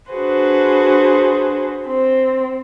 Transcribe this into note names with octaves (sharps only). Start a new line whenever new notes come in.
D4 F#4 G#4 B4 C5
C4